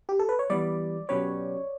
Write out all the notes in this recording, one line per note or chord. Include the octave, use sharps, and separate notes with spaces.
G4
A4
B4
C#5
E3 G3 B3 D5
B2 F#3 C#4 G4 B4 C#5